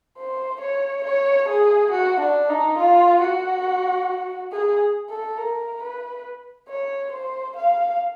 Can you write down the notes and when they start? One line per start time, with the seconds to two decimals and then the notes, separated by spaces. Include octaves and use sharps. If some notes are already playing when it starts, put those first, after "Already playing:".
0.17 C5
0.60 C#5
1.04 C#5
1.48 G#4
1.91 F#4
2.20 D4
2.49 D#4
2.78 F4
3.22 F#4
4.52 G#4
5.10 A4
5.38 A#4
5.82 B4
6.69 C#5
7.12 C5
7.56 F5